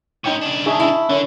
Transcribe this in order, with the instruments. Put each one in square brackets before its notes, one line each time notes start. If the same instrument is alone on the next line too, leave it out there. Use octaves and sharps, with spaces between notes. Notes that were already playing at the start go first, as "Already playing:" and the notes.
[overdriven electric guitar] A2 C#4 [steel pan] D#4 G5 C#6
[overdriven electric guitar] C#3 D4 [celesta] F#7
[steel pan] D#4 G#4 E5 [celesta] A5 C#6
[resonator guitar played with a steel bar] E4
[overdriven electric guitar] D3 [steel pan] C#4 [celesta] A#4 C#6